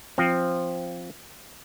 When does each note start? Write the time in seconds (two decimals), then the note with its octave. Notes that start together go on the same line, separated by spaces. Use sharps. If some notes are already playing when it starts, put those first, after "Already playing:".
0.18 F3 C4